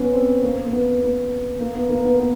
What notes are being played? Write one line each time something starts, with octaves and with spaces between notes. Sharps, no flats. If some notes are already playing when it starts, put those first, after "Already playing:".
Already playing: B3 C#4
C4
A#3
A#3
B3
B3
A#3
B3
A#3
B3
B3